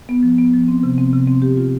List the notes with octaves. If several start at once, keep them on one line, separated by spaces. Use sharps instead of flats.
B3
F3
B3
F3
C4
C3
C4
C3
C4
G4
F4